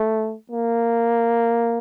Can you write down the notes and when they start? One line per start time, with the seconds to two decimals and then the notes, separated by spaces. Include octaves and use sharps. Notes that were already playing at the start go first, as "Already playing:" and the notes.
Already playing: A3
0.52 A#3